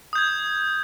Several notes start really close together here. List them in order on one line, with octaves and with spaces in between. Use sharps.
D#6 G6 G#6